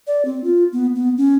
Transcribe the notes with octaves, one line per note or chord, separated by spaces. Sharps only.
D5
C4
F4
B3
B3
C#4